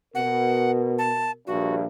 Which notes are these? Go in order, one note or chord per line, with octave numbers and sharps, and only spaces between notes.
B2 A#4 F#5
A5
A#1 G2 F#4